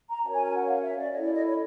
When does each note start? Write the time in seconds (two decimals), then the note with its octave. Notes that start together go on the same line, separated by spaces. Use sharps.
0.08 A#5
0.22 C#4 F#4 A#4 C#5 A5
0.34 G#5
0.45 G#5
0.56 F#5
0.67 F5
0.82 E5
0.97 D5
1.11 E4 A4 C#5 D#5
1.22 D5
1.34 D#5
1.45 C#5